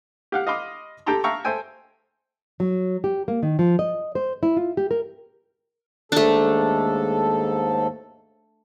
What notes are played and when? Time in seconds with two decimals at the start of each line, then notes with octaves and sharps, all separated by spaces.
0.32 G4 F5 F#5
0.47 D#5 F5 B5 C6 D6
1.06 G4 A4 G5 A5 A#5 C6
1.24 E5 F5 G5 A5 A#5 C#6
1.45 A4 C5 E5 G5 G#5
2.60 F#3
3.04 G4
3.28 A#3
3.43 D#3
3.59 F3
3.79 D#5
4.15 C5
4.43 E4
4.57 F4
4.77 G4
4.91 A#4
6.12 D#2 G#2 A3 D4 A4